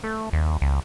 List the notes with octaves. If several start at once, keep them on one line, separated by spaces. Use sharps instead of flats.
A3
D#2
C#2